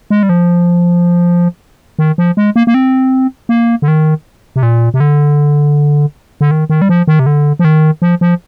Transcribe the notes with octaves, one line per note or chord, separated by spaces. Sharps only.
G#3
G3
F3
D#3
F3
G#3
A#3
A#3
C4
A#3
D3
D#3
C3
A#2
C3
D3
D3
D#3
D#3
G3
F3
D#3
C3
D3
F3
D#3
F3
F3